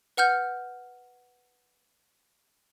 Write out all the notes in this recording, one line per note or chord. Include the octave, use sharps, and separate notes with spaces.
B4 F#5 F6 G6